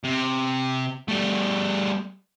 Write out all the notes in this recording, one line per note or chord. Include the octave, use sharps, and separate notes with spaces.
C3
G3 A3